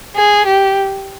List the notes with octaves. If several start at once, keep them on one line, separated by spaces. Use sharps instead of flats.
G#4
G4